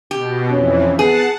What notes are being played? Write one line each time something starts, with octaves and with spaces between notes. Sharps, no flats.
B2 G4
F2 E3 C#4
B3 G#4 F#5 A5